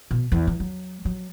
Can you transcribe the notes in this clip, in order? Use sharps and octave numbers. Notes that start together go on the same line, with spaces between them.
B2
E2
E3
F#3
F#3